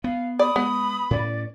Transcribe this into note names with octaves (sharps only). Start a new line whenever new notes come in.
B3 F5
D5 B5 D#6
G#3 B3
A2 C#4 D5